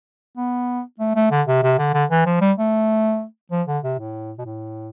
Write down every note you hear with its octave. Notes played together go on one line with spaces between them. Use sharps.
B3
A3
A3
D3
C3
C3
D3
D3
E3
F3
G3
A3
F3
D3
C3
A2
B2
A2